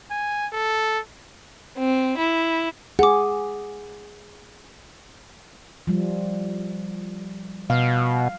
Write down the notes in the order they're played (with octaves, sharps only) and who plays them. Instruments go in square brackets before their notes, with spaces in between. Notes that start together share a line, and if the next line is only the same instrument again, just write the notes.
[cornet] G#5
A4
[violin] C4
E4
[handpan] G#4 [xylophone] F#5 D6
[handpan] F3 G3
[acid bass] B2 [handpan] F5